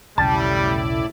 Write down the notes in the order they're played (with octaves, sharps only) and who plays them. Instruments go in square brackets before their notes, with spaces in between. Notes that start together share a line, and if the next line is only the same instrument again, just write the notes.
[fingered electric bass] E1 B1 C#3 [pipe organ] A2 E4 D5 [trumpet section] G3 [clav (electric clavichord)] A5